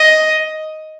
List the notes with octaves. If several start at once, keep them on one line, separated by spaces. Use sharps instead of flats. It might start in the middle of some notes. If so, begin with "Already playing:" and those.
Already playing: D#5